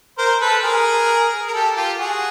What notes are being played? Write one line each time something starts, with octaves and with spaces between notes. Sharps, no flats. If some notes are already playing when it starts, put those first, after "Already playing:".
A#4 C5
A4 B4
G#4 A#4
A#4
G4 A4
F4 G4
F#4 G#4